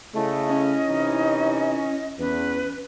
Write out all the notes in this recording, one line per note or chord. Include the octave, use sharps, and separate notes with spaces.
C#3 A3 E4 D#5
C#4
C3 E3 D#4
E2 C#4 B4